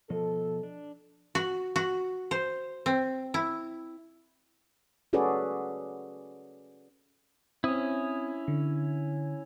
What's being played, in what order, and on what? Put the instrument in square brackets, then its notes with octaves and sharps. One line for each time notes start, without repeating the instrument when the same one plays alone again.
[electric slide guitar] B2 F3 D#5 [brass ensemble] A4
[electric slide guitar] D4
[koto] F#4
F#4
C5
C4
E4
[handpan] C#4 F#4 G#4 A4 B4 D5
[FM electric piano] C4 D#6 [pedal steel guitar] C#4 E4
[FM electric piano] D3